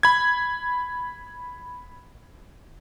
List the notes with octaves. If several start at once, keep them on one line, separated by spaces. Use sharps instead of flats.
B5 G#6